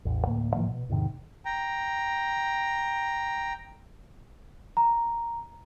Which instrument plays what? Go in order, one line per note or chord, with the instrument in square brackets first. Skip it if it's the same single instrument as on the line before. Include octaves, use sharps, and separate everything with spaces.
[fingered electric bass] A1 E2
D2 A2 A#3
A2 E3 F3 A#3
B2
E2 G#2 C3 D#3
[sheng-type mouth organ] G5 A#5
[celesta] A#5